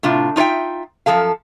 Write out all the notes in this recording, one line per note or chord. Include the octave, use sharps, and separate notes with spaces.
A2 C3 D4 F4
D#4 F4 C#5 E5 G5
F#2 E3 F3 A4 F5